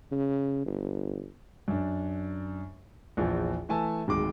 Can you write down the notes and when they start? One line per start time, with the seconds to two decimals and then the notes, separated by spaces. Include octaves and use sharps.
0.12 C#3
0.66 G1
1.68 F#2 D4
3.17 A#1 E2 F3
3.69 E3 A3 G#5 A5 E6
4.08 D1 D#3 G#3 D6